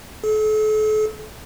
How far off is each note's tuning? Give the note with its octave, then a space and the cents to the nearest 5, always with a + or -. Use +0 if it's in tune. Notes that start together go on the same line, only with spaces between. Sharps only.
A4 -40